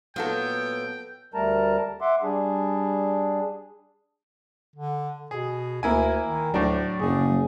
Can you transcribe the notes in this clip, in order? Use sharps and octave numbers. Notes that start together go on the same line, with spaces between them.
A#2 F#3 B3 A4 G5
D2 G3 A3 A#4 A5 A#5
E5 F#5 C6 D6
G3 D4 G#4
D3
B2 G#4
D2 A#3 E4 G#5
D#3
D2 A2 F#3 D4
F#1 G#4